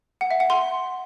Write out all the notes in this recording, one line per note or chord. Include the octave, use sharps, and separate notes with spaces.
F#5
E5
F#5
C6